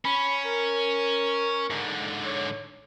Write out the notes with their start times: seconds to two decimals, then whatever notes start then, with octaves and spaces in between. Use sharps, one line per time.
0.05 C#4 B5
0.45 A#4
1.70 G#2 D3
2.25 C#5